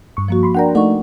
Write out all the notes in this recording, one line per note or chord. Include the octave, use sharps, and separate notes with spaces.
G2 C#6
F3 A#3 F#4
B5 C6
D4 A#4 D5 F#5 G5 A#5
A3 D#4 D5 F#5 C#6